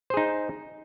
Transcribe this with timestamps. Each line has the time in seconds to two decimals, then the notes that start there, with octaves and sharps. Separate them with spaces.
0.10 C5
0.14 G#4
0.17 D#4